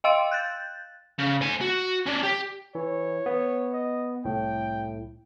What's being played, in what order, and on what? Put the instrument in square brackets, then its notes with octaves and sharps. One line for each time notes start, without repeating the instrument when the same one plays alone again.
[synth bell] D#5 F5 G5 C6 E6 D7
F#6 G6 A6
[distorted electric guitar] C#3
C5 G#5
F#4
C#4 D4
G4
[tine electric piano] E3 [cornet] C#5
[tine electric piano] B3
[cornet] D#5
[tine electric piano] C2 A2 [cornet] G5